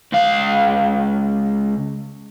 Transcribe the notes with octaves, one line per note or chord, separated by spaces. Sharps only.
C#2 F5